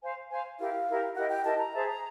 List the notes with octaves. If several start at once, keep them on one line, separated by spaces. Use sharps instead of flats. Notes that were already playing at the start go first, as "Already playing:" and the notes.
C5 F5 G#5
C5 F5 G#5
E4 G4 A#4 F5
E4 G4 A#4
E4 G4 A#4 D#5 F#5
G5
E4 G4 A#4 D#5 A5
A#5
G#4 C5 E5 A5